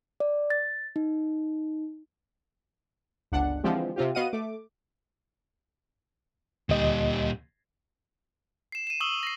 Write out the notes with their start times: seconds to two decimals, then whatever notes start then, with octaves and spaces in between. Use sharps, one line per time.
0.20 D5
0.50 A6
0.96 D#4
3.32 G1 C#2 D4 F#5
3.64 D3 E3 F3 G#3 C4 G4
3.96 C3 C4 F4 G4
4.15 B3 F#4 D#5 F5 F#5 D#7
4.33 A3 D6
6.69 D2 A#2 G3 D#5
8.72 C7 E7
8.87 D#7 E7
9.00 C#6 D#6 E6 F#7 G7
9.23 A#6 C7